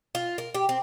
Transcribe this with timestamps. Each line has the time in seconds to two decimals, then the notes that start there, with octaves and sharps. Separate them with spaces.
0.15 F4
0.38 A#4
0.54 G4
0.69 C4